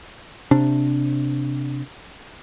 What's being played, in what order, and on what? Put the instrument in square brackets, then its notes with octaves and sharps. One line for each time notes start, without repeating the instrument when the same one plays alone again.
[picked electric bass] C3 D4